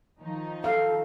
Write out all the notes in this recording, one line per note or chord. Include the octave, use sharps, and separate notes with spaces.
D#3 F3 D#4
A4 F5